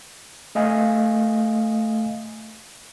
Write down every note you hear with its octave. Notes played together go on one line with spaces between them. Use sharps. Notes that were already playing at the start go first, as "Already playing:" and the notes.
A3 D#5 F5 G#5